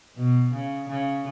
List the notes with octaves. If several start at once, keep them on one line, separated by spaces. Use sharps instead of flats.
B2
C#3
C#3